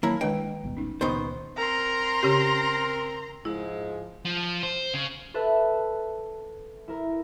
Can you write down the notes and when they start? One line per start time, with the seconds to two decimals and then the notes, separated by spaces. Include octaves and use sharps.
0.03 D#3 F#3 A#3 E4 C#5 F5 A5
0.21 D#3 G#3 D4 B4 D#5 G5
0.63 G1 D#2 B2
0.77 C#4 D#4
1.01 C#2 A#2 D#3 B3 D#4 C5
1.57 C4 A#4 A#5 C6
2.23 C#3 C#4 G4
3.45 G#2 F3 G#3 E4
4.25 F3
4.63 C5
4.94 C#3
5.34 A4 B4 E5 F#6
6.88 E4 A#4